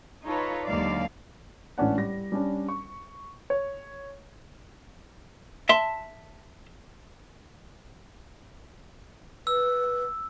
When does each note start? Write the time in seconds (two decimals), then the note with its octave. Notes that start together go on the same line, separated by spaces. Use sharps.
0.25 D#4 F4 A4 B4 C#5
0.66 D#2 D3 F#3 G#3 D5 F5
1.78 A1 G#2 C#4 D4 F#5
1.98 G3 A#6
2.32 G3 C#4 D4
2.69 C#6
3.50 C#5
5.69 E5 A5 C6
9.47 B4 E6